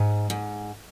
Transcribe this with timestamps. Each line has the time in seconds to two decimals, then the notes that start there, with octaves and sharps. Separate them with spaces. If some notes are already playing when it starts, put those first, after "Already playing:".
Already playing: G#2
0.30 G#2